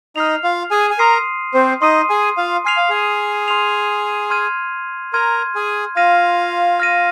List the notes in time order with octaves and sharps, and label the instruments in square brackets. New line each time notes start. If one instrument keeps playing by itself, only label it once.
[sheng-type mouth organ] D#4 D#5 [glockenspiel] F6 C7 F7
[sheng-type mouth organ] F4 F5
G#4 G#5
G#5
[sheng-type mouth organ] A#4 A#5 [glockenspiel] C6 D#6 C7 D#7
[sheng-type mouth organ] C4 C5
[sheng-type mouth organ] D#4 D#5 [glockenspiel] C6 D#6 C7 D#7
[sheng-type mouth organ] G#4 G#5
F4 F5
[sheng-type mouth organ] G#5 [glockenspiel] C6 F6 C7 F7
[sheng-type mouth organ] F5
G#4 G#5
[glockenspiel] C6 F6 C7 F7
C6 F6 G#6 D#7
[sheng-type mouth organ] A#4 A#5 [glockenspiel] C6 F6 G#6 D#7
[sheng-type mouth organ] G#4 G#5
[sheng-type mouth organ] F4 F5 [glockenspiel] F6 A#6 D#7
[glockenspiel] F6 A#6 D#7